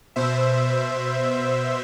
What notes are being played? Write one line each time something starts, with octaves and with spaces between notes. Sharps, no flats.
B2 C5 E5